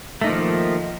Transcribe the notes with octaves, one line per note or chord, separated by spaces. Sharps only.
D#3 F3 A3 A#3 D#4